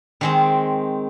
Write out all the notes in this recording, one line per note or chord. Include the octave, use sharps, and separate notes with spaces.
D#3 G#3 C4